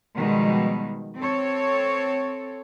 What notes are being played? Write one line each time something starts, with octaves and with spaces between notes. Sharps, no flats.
B2 D#3 F3 G3 G#3
C4 A4 C#5